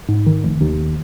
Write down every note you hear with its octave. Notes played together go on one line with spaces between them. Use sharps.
G#2
D#3
F1
D#2